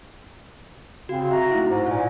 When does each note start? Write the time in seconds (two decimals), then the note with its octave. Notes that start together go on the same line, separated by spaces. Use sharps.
1.09 C#3 C4 F#4
1.31 F#4 E5 A#5
1.51 A3 D#4 E4
1.70 G#2
1.86 A#2 F4 G#5